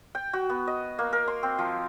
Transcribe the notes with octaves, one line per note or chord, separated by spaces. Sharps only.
G5
F#4
B3
D#5
A#3
A#4
C6
C4
F3